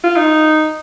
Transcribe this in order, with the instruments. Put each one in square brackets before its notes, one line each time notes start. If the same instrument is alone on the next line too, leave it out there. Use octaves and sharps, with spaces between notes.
[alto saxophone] F4
D#4